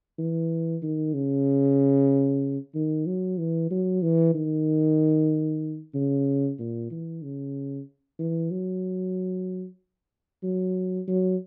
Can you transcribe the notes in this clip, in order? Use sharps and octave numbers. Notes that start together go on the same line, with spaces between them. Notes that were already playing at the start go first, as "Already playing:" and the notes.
E3
D#3
C#3
D#3
F#3
E3
F#3
E3
D#3
C#3
A#2
E3
C#3
E3
F#3
F#3
F#3